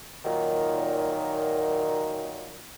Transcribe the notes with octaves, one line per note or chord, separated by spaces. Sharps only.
A#2 D#3 F#3